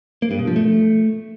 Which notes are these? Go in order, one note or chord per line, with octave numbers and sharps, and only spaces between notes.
A#3
G2
B2
F3
A3